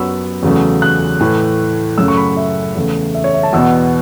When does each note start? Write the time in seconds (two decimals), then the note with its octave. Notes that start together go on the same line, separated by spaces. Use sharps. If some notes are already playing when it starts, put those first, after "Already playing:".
Already playing: F#2 F#3 B3 B5 C#6 E6
0.43 E2 C#3 F#3 A3
0.82 F#6
1.21 A2 E3 A3
1.98 F#2 C#3 A3 E6
2.08 C#6
2.17 B5
2.37 E5
2.76 E2 C#3 A3
3.15 E5
3.24 C#5
3.34 E5
3.43 A5
3.53 E2 B2 B3 E6